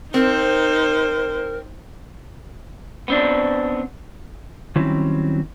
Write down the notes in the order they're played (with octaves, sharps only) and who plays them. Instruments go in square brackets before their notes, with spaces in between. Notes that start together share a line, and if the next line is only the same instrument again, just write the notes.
[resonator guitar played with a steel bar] C4 [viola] D#4 C5 [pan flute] A#4
[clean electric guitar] B3 C4 D4
[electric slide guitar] D#3 F#3 G3 C4 C#4 E4